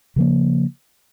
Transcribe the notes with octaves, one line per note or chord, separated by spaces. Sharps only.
C#3 F3 A#3